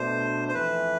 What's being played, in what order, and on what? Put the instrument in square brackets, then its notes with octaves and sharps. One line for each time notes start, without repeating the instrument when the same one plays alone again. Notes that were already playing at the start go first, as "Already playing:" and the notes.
Already playing: [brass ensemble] B2 A3 D4 [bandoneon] C5
[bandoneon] C5
[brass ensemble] F2 E3 A3 E4 [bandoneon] B4